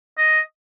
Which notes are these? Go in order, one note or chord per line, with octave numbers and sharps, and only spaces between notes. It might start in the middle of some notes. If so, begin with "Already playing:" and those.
D#5